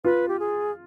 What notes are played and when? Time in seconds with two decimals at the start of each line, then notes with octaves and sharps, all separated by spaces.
0.05 F4 B4
0.28 G4
0.40 G#4